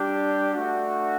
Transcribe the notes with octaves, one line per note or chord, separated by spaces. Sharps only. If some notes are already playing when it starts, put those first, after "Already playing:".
Already playing: G3 D4 G4
A3 D4 F#4